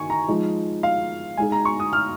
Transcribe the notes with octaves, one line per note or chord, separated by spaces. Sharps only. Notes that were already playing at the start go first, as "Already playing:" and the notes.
Already playing: D#3 G#5 C#6
A#5
F3 G#3 D#4
F5
G#3 D#4 G#4 G#5
A#5
C#6
D#6
F6